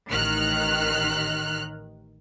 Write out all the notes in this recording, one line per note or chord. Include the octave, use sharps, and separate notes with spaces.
A1 D#3 F6 F#6